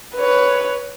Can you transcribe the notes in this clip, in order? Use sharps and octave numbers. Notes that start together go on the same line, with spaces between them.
B4 C#5